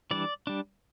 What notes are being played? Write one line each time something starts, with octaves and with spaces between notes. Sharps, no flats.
E3 G3 D4 D5
G3 D4